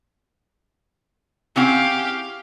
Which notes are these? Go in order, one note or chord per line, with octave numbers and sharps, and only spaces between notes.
C4 C#4 E4 G4 G#4 F5 F#5 D6